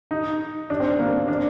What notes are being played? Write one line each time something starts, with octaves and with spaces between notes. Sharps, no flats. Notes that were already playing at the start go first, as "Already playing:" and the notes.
D#4
D4
C4
A#3
D4